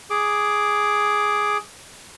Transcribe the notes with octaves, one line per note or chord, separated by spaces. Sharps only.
G#4 D6